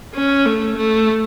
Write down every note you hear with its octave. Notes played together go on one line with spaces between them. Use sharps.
C#4
A3
A3